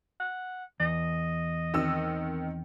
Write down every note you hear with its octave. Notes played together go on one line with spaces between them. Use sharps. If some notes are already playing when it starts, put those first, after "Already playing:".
F#5
E2 D#5
D#3 C4 E6